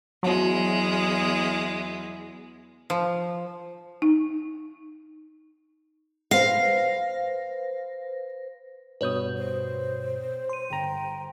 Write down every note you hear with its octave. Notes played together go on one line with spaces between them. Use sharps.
E2 F#3 G#3
F3
D#4
B4 C5 F5 A#6
G2 B2 B4 C#5 D#6 G6
C5
C6 D#7
G1 G5 A#5